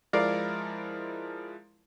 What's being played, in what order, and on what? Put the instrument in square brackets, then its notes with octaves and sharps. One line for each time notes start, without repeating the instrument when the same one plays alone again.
[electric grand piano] F3 G#3 E4 [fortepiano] A#4 D5 F5